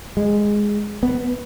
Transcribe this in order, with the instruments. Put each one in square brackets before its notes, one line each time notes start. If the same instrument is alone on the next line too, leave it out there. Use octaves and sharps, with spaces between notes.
[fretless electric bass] G#3
B3